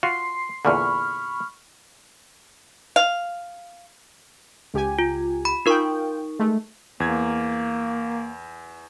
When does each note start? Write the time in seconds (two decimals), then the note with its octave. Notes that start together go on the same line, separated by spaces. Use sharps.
0.03 F4 F#4 C6 C7
0.65 E2 A#2 D3 B5 C#6 F6
2.96 F5
4.74 C#2 G4 G#5
4.99 F4
5.45 B5
5.66 D#4 F4 A#4 G5 C#6
6.39 G#3 A3
7.00 E2 A#3 G#6